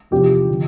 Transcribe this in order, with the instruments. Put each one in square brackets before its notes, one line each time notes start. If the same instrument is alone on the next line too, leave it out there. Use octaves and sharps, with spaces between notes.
[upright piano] E2 C3 F3 G4
D3 F3